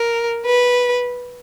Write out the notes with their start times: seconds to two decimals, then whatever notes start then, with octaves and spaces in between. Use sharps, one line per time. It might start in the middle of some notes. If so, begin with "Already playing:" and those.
Already playing: A#4
0.46 B4